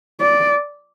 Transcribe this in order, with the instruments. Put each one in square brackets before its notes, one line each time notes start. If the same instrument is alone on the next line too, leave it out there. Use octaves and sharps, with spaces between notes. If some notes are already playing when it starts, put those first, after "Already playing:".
[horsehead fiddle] D5